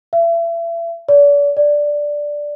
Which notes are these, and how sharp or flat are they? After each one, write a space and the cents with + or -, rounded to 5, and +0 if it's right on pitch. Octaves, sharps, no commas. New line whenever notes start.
E5 +35
D5 -40
D5 +0